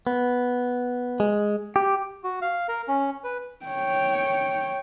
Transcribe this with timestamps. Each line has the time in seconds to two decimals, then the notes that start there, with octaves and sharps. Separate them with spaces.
0.07 B3
1.20 G#3
1.76 G4
2.24 F#4
2.42 F5
2.68 A#4
2.88 C#4
3.24 B4
3.66 C#5 G5